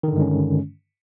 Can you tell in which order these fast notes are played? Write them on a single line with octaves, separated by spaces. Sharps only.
D#3 D3 G2 G#3 C#4